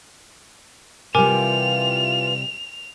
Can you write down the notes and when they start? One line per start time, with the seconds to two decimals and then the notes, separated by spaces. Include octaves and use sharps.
1.15 C3 E3 G3 F4 A#4 G#5 D6 F7